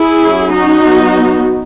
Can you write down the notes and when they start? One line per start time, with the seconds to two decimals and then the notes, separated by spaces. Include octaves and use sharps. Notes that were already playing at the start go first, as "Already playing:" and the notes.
Already playing: E4 G#4
0.23 F#3 C#4
0.53 D#4 F#4
0.83 F#3 B3